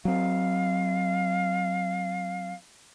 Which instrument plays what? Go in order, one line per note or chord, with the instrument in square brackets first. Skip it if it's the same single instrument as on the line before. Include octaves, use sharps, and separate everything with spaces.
[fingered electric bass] F#3 C4 [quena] F5